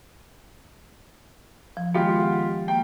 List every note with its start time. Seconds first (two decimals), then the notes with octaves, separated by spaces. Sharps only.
1.77 F3
1.95 D#3 G#3 B3 F4 G4
2.17 G#4 F#5
2.68 A#3 G5